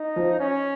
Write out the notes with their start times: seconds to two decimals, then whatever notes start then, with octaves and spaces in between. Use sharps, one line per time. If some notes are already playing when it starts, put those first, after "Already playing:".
Already playing: D#4
0.16 F3
0.39 C#4